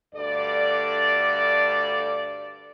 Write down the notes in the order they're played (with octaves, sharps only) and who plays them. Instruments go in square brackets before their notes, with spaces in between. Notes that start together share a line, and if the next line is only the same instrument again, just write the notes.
[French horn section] D2 G2 A4 D5